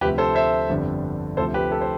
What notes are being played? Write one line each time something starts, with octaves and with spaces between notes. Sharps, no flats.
D2 C3 F3 G4 B4
A4 C5
C5 E5
G1 F2 D3 G3 D4
D2 C3 F3 A4 C5
G4 B4
A4
C5